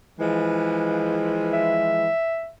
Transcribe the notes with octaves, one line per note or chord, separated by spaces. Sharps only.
E3 F3 G#3
E5